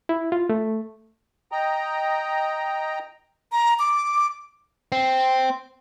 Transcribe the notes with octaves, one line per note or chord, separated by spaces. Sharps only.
E4
F4
A3
D#5 G5 A#5
A#5
D6
C4